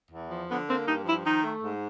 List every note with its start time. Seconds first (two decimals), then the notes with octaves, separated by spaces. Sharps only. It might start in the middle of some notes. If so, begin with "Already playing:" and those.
0.11 E2
0.29 F3
0.49 D3 B3
0.67 A#3 C4
0.86 G2 D#4
1.05 F3 E4
1.24 D#3 D#4
1.43 A3
1.62 G#2